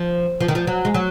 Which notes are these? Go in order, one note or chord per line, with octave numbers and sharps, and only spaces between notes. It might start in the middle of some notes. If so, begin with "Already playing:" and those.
Already playing: F3
F3
D#3
F3
F#3
G#3
F#3